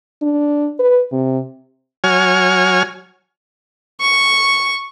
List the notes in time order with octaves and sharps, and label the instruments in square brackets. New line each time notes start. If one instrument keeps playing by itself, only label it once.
[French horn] D4
B4
C3
[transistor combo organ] F#3 C#5 G#5 F6
[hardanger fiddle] C#6